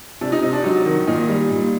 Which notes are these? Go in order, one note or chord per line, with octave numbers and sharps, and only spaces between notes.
C3 D4
D#4
C3 D#4
D4
F#3 D#4
D#3
A#2 D#4
G3
A#2